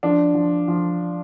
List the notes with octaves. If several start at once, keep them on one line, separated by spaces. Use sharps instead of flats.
F3 D4
F3
F3